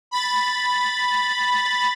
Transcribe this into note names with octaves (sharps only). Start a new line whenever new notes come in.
B5 A6